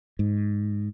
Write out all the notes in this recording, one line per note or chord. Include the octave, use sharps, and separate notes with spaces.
G#2